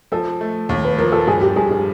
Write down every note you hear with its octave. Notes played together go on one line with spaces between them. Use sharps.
F3 A4
A3
D#2
B4
F3 A#4
A4
G2 G#4
G4
G2 G#4
G#4